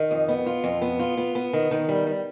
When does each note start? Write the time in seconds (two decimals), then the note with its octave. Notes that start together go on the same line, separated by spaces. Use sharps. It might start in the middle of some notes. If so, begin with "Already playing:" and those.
Already playing: D#3
0.11 F2
0.28 B3
0.46 F4
0.64 F2
0.82 B3
0.99 F4
1.17 B3
1.35 B3
1.53 D#3
1.71 D#3
1.89 G3
2.07 G3